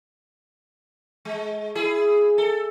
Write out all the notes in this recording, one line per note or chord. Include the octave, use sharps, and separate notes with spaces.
G#3
E4 G#4
A4